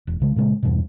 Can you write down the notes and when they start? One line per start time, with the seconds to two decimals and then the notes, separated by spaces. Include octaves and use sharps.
0.07 E1
0.20 C2 C#3 G#3
0.36 A#2 C#3 G#3
0.63 E2 G2 B2